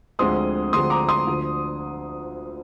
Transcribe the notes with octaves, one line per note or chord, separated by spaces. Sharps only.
D2 D3 F3 G#3 C4 C6 D#6
D2 D3 F3 G#3 C4 C6 D#6
A#5 D6
C6 D#6
D2 D3 F3